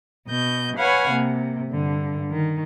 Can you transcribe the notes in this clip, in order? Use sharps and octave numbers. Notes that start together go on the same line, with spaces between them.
B2 D#5 G6
B4 C#5 F5 F#5 G#5 B5
C3 A#3
G2 D3
D#3